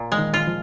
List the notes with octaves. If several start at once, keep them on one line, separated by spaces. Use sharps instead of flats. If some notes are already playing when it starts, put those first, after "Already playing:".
Already playing: A#2
G#3
D#3
F4
F3